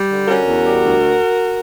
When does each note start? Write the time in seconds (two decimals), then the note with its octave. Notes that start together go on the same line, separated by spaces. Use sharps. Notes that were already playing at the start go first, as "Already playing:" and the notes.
Already playing: G3
0.10 D3
0.27 C#4 F#4 A#4
0.46 E2
0.64 G3
0.82 D2